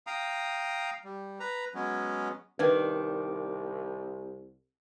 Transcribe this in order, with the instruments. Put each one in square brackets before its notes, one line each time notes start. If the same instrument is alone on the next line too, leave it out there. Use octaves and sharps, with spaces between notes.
[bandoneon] F5 G5 A#5 D#6
G3
B4 A#5
F#3 G#3 B3 C#4
[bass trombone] C2 [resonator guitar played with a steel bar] D#3 D4 [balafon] B4